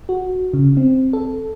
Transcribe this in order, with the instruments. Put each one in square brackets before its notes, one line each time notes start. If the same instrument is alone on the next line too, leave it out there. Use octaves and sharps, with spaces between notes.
[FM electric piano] F#4
C#3
C4
A4